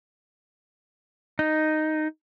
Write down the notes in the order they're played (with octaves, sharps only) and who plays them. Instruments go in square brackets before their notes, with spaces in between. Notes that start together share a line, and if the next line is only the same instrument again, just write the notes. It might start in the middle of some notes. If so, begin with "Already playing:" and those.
[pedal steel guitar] D#4